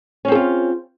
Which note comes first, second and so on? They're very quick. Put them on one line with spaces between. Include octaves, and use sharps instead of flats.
C#4 C4 A4 F4